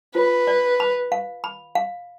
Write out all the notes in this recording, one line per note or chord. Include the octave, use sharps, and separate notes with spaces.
F4 B4
D5
B5
F5
B5
F5